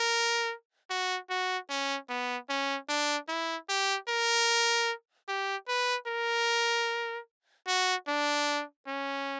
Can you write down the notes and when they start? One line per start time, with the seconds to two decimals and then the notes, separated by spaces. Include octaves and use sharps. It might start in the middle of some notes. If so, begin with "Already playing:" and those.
Already playing: A#4
0.90 F#4
1.30 F#4
1.69 C#4
2.09 B3
2.50 C#4
2.89 D4
3.29 E4
3.69 G4
4.09 A#4
5.29 G4
5.68 B4
6.08 A#4
7.68 F#4
8.08 D4
8.87 C#4